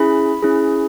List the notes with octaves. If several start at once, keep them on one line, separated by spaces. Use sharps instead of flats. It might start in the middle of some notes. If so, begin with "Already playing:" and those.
Already playing: C#4 E4 G#4 B5
C#4 E4 G#4